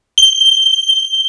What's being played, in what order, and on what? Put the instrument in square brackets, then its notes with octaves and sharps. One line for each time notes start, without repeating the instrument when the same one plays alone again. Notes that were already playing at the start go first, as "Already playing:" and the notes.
[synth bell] G7